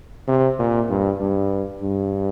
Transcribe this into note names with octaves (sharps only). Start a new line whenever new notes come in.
C3
A#2
G2
G2
G2